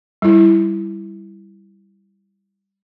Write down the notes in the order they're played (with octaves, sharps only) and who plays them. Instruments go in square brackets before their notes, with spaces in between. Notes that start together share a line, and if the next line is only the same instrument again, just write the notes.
[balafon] G3 E4